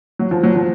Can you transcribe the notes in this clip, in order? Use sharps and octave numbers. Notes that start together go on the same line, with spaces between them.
F#3
F3
F#3
F3